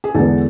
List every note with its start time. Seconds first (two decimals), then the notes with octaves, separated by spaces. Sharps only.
0.04 G#4
0.14 E2 D3 G#3 B3 A4